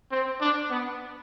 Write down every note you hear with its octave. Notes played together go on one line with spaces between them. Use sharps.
C4
D4
B3